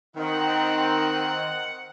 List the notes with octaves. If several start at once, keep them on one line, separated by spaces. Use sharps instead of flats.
D#3 C4 D#4 F#5